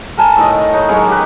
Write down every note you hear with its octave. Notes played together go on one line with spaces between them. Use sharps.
A4 A#4 G#5 A5
A2 D#3 D#5
D#4 B4 C#5
F#3 G#3 A#4 C#5
G4 B4